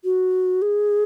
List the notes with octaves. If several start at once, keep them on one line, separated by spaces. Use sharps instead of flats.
F#4
G#4